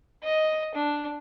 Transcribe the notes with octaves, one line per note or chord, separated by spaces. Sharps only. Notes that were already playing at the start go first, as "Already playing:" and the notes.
D#5
D4